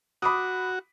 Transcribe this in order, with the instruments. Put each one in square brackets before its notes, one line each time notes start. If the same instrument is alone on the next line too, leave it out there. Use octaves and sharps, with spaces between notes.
[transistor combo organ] F#4 [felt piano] B5 D6 D#6